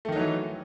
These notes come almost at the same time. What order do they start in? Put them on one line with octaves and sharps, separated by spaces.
A3 D#3 D#4 F#3 E3